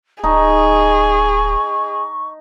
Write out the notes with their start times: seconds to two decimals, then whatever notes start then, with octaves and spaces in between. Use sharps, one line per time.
0.24 D1 D#4 G#4 A5 C#6